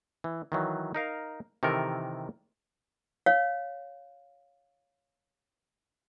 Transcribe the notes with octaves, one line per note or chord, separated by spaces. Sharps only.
E3
D#3 E3 F#3
D#4 A#4 F5
C3 D#3 E3 A4 A#4
C#5 F5